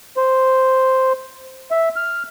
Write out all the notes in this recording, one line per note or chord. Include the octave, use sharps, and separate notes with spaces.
C5
E5
F6